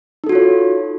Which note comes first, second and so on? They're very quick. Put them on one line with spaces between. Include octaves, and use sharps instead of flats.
D#4 A4 F#4 F4 C#5